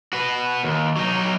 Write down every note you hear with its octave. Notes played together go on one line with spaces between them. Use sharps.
F#4 B4
D#2
F#3 D#4